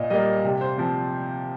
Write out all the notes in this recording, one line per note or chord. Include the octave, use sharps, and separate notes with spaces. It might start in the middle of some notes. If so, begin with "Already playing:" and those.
Already playing: A#2 D#5
G3 A#3 D#5
C3
C5
F3 C4